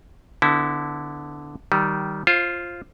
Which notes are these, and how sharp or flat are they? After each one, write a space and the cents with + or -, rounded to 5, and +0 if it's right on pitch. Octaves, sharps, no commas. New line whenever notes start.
D3 +0 B3 +20 E4 -20
D#3 +0 G3 -20
F4 -5 C5 +25